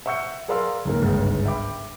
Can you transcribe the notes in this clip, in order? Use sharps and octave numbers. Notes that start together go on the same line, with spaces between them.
E5 F#5 C#6 E6 G6 C#7
G#4 A#4 D5 F5 C6 E6
C#2 G#2 A#3
G1 C#2 G#2
E5 G5 B5 D6